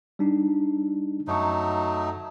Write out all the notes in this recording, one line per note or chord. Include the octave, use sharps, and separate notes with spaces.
G3 D4 D#4
F#2 F#3 A3 D#4 C#6